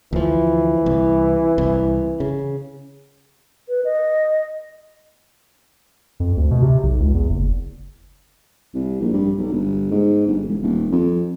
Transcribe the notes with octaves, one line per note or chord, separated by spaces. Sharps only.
D2 E3 F3
C2
C2
C#3
B4
D#5
F2
D2
B2
C3
B1
C#2
E2
F#1
C2
A#1
G2
B1
G1
G#2
G1
E1
D#1
F2